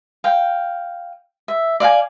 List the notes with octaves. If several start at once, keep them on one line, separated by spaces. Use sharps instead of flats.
F5 G5
E5
D5 F5 F#5 G#5